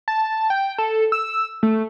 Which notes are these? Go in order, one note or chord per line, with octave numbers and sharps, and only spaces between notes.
A5
G5
A4
E6
A3